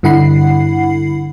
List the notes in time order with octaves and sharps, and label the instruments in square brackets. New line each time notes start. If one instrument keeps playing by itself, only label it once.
[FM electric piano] G2 D3 E4 F#5 B5 C7